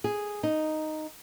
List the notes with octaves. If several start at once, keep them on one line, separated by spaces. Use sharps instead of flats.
G#4
D#4